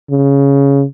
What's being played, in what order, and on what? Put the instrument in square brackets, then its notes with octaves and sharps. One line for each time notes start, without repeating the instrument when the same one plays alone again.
[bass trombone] C#3